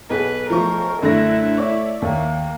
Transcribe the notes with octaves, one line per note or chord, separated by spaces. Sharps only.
B1 G#4 B4
F3 A3 A#4 C#6
F#2 D3 A3 E4 A#6
C#5 D5 E5
D#2 A#3